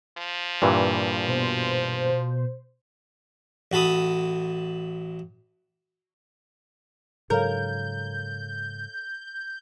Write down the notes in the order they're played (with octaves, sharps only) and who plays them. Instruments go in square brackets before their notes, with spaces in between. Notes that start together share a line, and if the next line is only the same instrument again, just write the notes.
[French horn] F3
[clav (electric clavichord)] G2 A#2 E3
[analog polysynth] B2 C5
[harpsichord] A1 F#4 A4 B5 D#6
[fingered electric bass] G#2 C#3 F#3 [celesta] A4 C#5 F5 [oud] A#4 [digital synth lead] G6